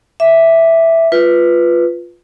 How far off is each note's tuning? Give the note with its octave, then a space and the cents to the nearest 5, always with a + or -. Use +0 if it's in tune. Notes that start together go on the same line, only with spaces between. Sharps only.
E5 +0 D6 +0
F4 +0 B4 +0